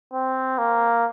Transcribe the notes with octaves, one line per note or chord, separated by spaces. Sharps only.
C4
A#3